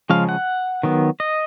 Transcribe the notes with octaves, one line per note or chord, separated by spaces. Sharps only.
C#3 F3 G#3 C#4 F5
F#5
D#3 F#3 B3
D#5